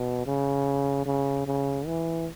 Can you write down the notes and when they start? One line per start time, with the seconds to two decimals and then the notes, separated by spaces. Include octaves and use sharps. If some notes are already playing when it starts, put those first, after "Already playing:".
Already playing: B2
0.26 C#3
1.06 C#3
1.47 C#3
1.86 E3